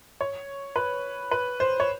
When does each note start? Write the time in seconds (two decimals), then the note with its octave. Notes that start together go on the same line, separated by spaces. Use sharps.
0.21 C#5
0.76 B4
1.31 B4
1.60 C5
1.80 C#5